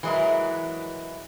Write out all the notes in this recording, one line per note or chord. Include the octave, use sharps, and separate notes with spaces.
E3 F#3 G#3 D4 E4 A#4